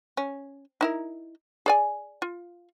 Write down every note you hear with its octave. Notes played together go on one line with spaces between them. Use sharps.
C#4
D#4 E4 A#4
G#4 D5 G#5
F4